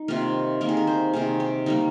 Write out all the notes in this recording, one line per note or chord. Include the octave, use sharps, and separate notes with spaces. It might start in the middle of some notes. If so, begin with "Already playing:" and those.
Already playing: D#4
C3 D#3 A#3 F4
C3 D#3 A#3 A#4
G#4
A#4
C5
C3 D#3 A#3 G#4
G4
D#3 G3 A#3 D#4